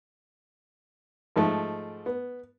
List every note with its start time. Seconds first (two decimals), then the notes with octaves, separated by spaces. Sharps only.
1.36 G#2 F3 G#3 A3
2.06 B3